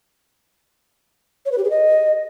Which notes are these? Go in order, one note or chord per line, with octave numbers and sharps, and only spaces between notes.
C#5
B4
G4
G#4
D#5